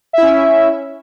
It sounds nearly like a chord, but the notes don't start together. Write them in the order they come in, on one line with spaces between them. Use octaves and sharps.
E5 E4 C#4